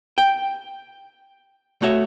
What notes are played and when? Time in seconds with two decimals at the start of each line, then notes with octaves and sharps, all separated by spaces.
0.18 G5
1.82 A3 F#4 C#5 E5